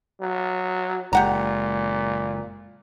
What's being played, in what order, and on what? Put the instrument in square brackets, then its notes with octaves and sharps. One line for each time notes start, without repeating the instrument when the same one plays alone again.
[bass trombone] F#3
[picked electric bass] F#1 G#3 [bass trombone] A#2 [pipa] G4 F#5 A#5